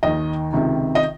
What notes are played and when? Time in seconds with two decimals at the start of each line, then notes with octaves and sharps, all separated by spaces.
0.03 D#2 D#3 D#5
0.53 C#2 C3 D#3
0.95 D#5